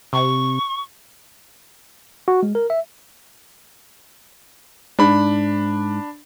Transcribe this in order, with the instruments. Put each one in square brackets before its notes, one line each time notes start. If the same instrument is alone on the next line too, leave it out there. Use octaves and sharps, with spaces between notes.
[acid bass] C3 [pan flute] C#6
[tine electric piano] F#4
G#3
A#4
E5
[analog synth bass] G#2 [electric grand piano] D4 B5